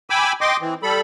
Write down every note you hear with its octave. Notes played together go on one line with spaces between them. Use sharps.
G5 G#5 B5 D6 E6
D#5 G5 C6 D6
E3 C4
G3 A4 B5